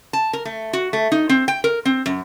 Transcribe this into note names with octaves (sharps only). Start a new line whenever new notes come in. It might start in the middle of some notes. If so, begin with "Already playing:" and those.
A5
A#4
A3
F#4
A3
D#4
C4
G5
A#4
C4
F#2